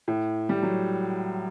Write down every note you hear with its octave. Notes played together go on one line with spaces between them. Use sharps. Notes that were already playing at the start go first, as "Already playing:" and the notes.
A2
G3
F#3